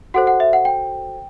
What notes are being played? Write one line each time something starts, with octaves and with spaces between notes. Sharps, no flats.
F#4 A4 C5 F#5
F#5
E5
F#5
G5